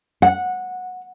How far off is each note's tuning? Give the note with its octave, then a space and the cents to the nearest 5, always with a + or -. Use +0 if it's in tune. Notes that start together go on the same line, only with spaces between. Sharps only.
F#5 -15